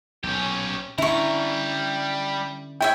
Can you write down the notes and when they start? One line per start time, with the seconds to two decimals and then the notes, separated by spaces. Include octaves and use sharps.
0.24 B1 A#2 C#4 G4
0.98 D3 G3 C#4 D4 E4 A#5 C#6
2.81 E4 C#5 E5 G5